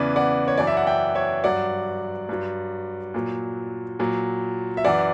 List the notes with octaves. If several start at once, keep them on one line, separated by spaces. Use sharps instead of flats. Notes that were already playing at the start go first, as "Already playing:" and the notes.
Already playing: E2 C#3 E3 B4 D5
D5 F#5
C#5
F#2 E3 D5
E5
F#5
E5 G5
C#5 E5
G2 F#3 D5 F#5
G2 F#3
A#2 F#3
A#2 F#3
E5
F#2 E3 D5 F#5